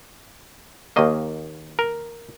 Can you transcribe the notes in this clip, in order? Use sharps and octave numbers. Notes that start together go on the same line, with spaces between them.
D#2 D#3 A#3 D#5
A#4